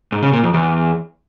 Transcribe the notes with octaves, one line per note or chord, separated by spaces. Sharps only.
G#2
C#3
A#2
F2
E2